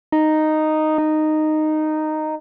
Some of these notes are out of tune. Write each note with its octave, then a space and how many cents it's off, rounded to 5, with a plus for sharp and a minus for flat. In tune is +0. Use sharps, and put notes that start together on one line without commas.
D#4 -5
D#4 -10